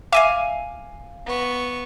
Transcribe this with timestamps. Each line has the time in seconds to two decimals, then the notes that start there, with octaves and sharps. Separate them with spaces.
0.13 E5 F5 G#5 D6
1.26 B3 C#6